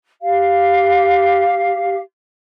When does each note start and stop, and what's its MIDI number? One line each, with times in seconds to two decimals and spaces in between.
0.21 1.98 67
0.21 1.98 77